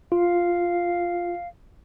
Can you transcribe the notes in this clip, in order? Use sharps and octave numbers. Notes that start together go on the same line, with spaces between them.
F4 F5